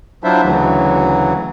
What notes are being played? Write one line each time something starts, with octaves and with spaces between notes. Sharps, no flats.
F#3 D4 E4 F4 C5 E5
D2 C#3 E3 F#3